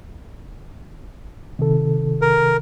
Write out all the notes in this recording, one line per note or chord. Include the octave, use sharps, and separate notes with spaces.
C3 D#3 A4
A#4